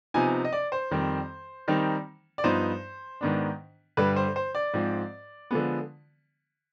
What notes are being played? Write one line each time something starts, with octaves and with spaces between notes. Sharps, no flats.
C3 F3 B3 D#4 G#5
D#5
D5
C5
F2 D#3 G3 C4
D#3 G3 C4 D#4
D5
G2 F3 B3 D#4 C5
G#2 D#3 B3 D4
G2 D3 G3 B4
C5
C5
D5
G#2 F3 C4
D3 F3 G#3 B3